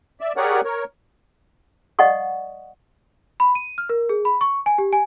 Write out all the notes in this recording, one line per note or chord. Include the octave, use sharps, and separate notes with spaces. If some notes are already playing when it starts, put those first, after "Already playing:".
D5 E5
G4 G#4 A#4 C#5 D5 F#5
A#4 C#5
D5 D#5 F5 F#5 C#6 D#6
B5
D#7
F6
A#4
G#4
B5
C#6
G#5
G4
G#5